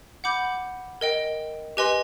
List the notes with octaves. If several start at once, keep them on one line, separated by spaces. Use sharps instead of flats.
F#5 B5 D6 G6
A#4 D#5 G5
G4 B4 D#5 G#5 C6